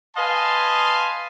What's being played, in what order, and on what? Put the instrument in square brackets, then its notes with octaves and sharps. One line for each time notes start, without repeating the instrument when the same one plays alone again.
[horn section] B4 D#5 F5 G#5 A5 C6